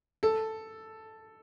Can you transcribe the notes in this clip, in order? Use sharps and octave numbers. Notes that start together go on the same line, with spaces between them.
A4